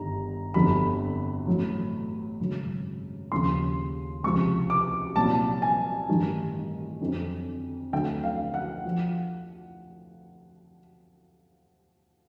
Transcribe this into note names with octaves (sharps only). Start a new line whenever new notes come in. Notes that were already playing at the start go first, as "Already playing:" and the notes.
Already playing: G1 G2 D#3 G3 A#5
G1 F2 D3 G3 B5
A1 A2 F#3
G#1 F#2 C#3 F#3
D#2 C#3 F3 C6
C#2 C3 F3 C#6
D6
C2 A#2 F#3 A5
G#5
A1 G2 D#3 G3
F2 D3 F#3
D2 D3 F#3 G5
F5
F#5
F3